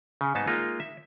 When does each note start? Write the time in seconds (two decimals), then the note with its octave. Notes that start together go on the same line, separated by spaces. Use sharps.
0.21 C#3
0.35 G#2 G3 B3 D#4 C#5 A5
0.47 G#3 A#3 D#4 F4
0.80 E5